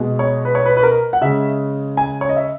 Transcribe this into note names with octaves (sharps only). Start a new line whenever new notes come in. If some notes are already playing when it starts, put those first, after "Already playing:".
Already playing: B2 G#3
C#5
B4
C#5
B4
B4
A#4
F#5
C#3 G#3 E5
G#5
C#5
D#5
E5